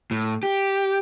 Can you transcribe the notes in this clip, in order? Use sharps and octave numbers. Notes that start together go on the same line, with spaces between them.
A2
G4